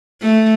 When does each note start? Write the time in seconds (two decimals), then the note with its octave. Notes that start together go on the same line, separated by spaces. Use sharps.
0.22 A3